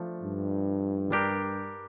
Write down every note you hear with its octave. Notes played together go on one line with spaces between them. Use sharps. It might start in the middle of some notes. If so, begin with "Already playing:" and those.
Already playing: F3 A3 D4
G2
G3 D4 G4 A#4